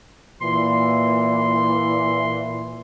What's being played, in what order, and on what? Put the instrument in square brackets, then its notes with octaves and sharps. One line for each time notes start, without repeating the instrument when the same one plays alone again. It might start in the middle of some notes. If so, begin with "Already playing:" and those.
[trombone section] A#2 E3 [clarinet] C6